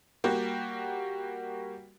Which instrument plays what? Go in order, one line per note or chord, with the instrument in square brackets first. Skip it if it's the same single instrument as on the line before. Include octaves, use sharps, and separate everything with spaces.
[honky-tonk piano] G3 A#3 F#4 G4